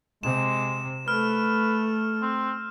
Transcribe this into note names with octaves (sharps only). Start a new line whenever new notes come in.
C3 G#3 E7
A3 B4 F6
C4